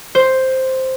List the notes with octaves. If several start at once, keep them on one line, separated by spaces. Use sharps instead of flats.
C5